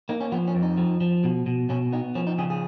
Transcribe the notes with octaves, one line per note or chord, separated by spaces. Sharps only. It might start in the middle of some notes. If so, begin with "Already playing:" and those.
A#3 D#4
C#4
F3 B3
C#4
F2
D#4
F3
F3
B2
B2
B2 C#4
B3 D#4
F3 C#4
D#4
C#3 G#4
G#4